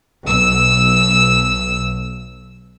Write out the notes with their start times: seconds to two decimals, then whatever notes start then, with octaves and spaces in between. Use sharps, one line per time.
0.24 B1 E6